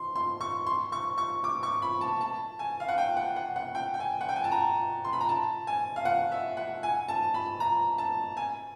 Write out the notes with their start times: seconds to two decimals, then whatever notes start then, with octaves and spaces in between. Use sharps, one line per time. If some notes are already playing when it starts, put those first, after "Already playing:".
Already playing: C6
0.16 C6
0.41 C#6
0.67 C6
0.92 C#6
1.18 C#6
1.44 D6
1.63 C#6
1.82 B5
2.01 A5
2.21 A5
2.59 G#5
2.80 F5
2.88 F#5
2.98 G5
3.17 F#5
3.36 F#5
3.56 F#5
3.75 G5
3.94 G5
4.00 G#5
4.21 F#5
4.29 G5
4.36 G#5
4.44 A5
4.52 A#5
5.05 C6
5.13 B5
5.21 A#5
5.29 A5
5.67 G#5
5.96 F5
6.05 F#5
6.32 E5
6.57 F#5
6.83 G#5
7.09 A5
7.34 B5
7.60 A#5
7.98 A5
8.37 G#5